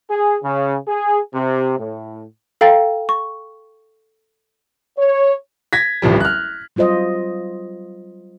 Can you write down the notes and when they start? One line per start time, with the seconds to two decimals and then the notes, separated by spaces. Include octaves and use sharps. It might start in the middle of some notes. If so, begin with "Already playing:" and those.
0.10 G#4
0.43 C#3
0.88 G#4
1.34 C3
1.79 A2
2.61 A4 F5 G5 A#5 A6
3.09 C#6
4.99 C#5
5.73 G#6 A#6 B6
6.02 D1 A1 F3 G3
6.20 F6 F#6
6.76 F#3 G3 F4 C5 D#5